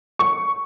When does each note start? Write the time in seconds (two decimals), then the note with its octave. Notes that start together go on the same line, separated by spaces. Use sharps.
0.19 C#6